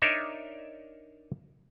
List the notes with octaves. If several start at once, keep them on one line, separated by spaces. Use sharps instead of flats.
D4 D#4 A#4 C#5 D#5 E5